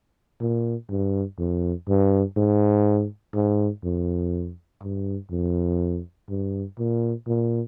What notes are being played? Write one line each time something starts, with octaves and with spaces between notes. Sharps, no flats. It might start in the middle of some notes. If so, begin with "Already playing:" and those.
A#2
G2
F2
G2
G#2
G#2
F2
G2
F2
G2
A#2
A#2